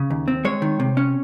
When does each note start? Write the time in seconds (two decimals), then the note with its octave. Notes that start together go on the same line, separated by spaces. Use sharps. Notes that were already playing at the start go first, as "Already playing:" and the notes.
Already playing: C#3
0.10 D#2
0.28 C4
0.45 G#3 C#5
0.62 D#3
0.80 C3
0.97 C#4